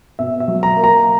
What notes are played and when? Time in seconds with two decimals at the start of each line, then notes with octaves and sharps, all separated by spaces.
0.19 B2 E5
0.40 E5
0.48 F#3
0.63 A#5
0.76 A#3
0.84 A#5